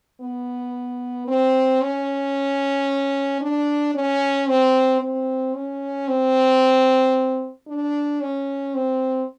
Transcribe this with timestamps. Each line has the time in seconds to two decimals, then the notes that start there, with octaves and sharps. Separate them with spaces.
0.21 B3
1.28 C4
1.82 C#4
3.41 D4
3.94 C#4
4.48 C4
5.01 C4
5.54 C#4
6.08 C4
7.68 D4
8.21 C#4
8.75 C4